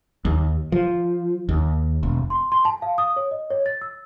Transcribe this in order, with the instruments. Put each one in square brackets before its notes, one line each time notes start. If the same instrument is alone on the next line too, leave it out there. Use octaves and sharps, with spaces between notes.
[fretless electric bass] D#2
F3
D#2
E1
[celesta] C6
C6
A5
F5
D#6
C#5
D#5
C#5
A6
E6